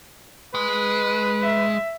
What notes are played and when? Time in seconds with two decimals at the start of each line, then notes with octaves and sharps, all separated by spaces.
0.55 G#3 B4
1.42 E5